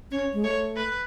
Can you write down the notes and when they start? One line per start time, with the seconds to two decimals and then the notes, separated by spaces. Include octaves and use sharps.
0.11 C#4 C#5
0.33 G#3
0.44 A3 C#5
0.76 B4